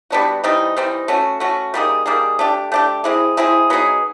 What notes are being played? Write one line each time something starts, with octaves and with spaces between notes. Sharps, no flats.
G3 B3 D4 F#4
E3 G3 C4 D#4
E3 G3 C4 D#4
A3 C#4 F#4
A3 C#4 F#4
G3 A#3 D#4 G#4
G3 A#3 D#4 G#4
A3 D4 G4
A3 D4 G4
G#3 C4 E4 G#4
G#3 C4 E4 G#4
F#3 B3 D#4 G#4